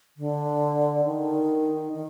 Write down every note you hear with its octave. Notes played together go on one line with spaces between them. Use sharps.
D3
D#3
D#3